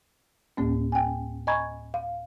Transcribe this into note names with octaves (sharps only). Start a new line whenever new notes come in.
D2 A2 A#3 C#4
G5 G#5
D#5 G#5 A#5 B5 C#6 G#6
F5